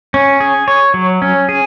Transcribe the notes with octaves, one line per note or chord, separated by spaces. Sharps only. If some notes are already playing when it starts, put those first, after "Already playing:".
C#4
G#4
C#5
F#3
C#4
G#4